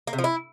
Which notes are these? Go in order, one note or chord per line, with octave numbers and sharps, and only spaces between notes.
A#3
C3
F3
E4